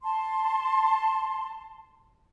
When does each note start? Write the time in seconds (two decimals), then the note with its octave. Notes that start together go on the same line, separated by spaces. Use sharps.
0.02 A5 C6